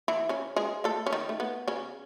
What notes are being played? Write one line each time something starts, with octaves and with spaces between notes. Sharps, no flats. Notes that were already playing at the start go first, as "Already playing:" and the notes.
E3 E4
C#3 C#4
G#3 G#4
A3 A4
C#4
D#3 D#4
A3
B3
C#3 C#4